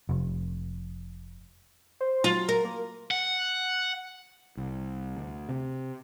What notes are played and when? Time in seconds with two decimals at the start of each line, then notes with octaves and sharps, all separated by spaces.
0.09 F1
2.01 C5
2.24 F#3 F4
2.49 A#4
2.65 A#3
3.11 F#5
4.57 C2
5.17 D2
5.49 C3